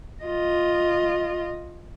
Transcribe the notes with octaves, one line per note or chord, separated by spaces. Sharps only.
F4 D#5